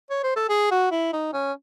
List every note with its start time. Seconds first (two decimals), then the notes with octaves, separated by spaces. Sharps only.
0.10 C#5
0.24 C5
0.36 A4
0.49 G#4
0.71 F#4
0.92 E4
1.13 D#4
1.34 C#4